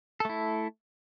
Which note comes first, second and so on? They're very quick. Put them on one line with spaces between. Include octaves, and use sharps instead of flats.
A4 A3 E4